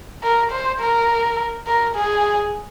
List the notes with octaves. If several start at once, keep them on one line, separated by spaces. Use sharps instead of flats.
A#4
C5
A#4
A#4
G#4